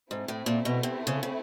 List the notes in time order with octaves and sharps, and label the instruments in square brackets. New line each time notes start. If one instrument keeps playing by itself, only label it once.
[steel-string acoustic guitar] G#2 [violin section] A3 C4 E4
[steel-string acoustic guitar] A2
A#2
B2
C3
C#3
C#3